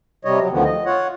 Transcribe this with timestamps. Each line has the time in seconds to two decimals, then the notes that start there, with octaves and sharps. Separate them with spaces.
0.25 C3 G3 C#5 D#5
0.39 F#3
0.52 D2 D3 D#3 F3 B3
0.65 D#5
0.86 F4 C#5 F#5